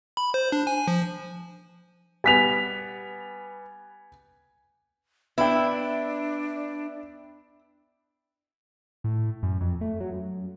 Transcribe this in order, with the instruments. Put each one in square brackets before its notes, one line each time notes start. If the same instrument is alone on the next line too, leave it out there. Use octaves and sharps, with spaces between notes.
[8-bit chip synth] B5
C5
D4
G#5
F3
[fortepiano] G3 B3 [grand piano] G#5 B6 F7
[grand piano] B3 E5 G5 [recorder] D4 [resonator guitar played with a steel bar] E4
[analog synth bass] A2
F#2
F2
A3
F#3
F#2